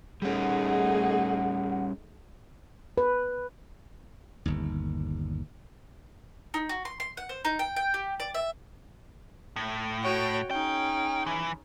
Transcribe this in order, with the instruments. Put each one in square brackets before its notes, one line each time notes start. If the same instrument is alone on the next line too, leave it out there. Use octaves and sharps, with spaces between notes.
[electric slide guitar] G3 C#4 [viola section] A3 D#4 G#4 [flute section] F#5
[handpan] B4
[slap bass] G1 D#2
[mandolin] D#4
F#4
C6
C6
F#5
C5
D#4
G5
G5
G4
D5
E5
[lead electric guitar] A2
[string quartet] F#4 C#5 G5
[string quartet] C#4 D#4 G#4 [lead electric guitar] G5
[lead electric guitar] E3